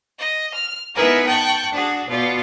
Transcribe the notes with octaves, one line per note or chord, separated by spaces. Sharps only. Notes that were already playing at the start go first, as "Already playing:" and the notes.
D#5
F6
B3 D#4 E4 G#4 A#4 B4
G5 A5 C#6 F#6
D4 F#4 G#4
B2 F4 D5